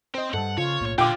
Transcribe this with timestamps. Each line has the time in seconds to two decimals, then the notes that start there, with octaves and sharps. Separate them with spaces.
0.15 C4 C5 D#5
0.34 G2 G3 A4 F#5
0.58 C#3 F4 C#5
0.81 B1 A2 A#3
0.98 A#2 D3 F4 G5 D6